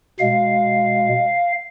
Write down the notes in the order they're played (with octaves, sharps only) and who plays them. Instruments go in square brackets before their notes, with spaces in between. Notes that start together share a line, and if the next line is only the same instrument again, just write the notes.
[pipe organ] B2 G#3 F5